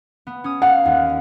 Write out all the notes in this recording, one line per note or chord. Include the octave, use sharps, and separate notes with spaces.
B3
C#4 D#6
F5 F#5
D#2